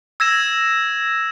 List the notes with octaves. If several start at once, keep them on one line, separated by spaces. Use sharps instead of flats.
E6 G#6 A#6 E7